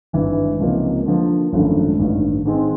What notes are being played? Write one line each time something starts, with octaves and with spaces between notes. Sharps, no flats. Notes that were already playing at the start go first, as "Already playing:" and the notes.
G#1 G2 E3
C#2 C3 F3 A#3 D#4
D3 F3 A#3
G#1 F#2 D3 F3 A3
A1 G2 D#3
G#2 D#3 G#3 C4